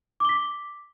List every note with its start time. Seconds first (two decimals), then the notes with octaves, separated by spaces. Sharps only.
0.20 D6
0.25 G7
0.29 B6